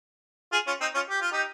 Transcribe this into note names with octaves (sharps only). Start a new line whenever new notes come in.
F4 G#4
C#4 F4
C4 D#4
C#4 F4
G4
F4
D#4 G4